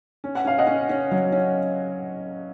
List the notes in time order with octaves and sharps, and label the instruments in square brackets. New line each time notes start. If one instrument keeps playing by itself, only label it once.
[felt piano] C#4
[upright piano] F#5
[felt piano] C#4 [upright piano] F5
[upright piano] D#5 F#5
[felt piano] C#4
C#4
F#3
C#4